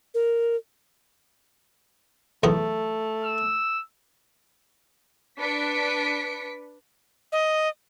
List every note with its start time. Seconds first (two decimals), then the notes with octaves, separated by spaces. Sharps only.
0.14 A#4
2.43 B1 E2 A3 B3
3.24 E6
5.40 D4 B4 B6 C#7 D7
7.32 D#5